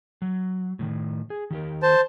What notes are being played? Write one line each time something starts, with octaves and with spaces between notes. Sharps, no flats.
F#3
A2 C3 D#3
G#4
D#3 G4 A#4
C5 A5